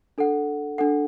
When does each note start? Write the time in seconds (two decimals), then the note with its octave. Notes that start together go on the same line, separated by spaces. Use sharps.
0.18 D4 A4 F#5
0.78 D4 A4 F#5